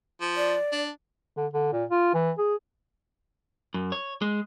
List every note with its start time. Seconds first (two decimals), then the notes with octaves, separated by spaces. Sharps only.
0.21 F3
0.36 D5
0.72 D4
1.37 D3
1.53 D3
1.73 A#2
1.90 F4
2.14 E3
2.38 G#4
3.74 F#2
3.92 C#5
4.22 G#3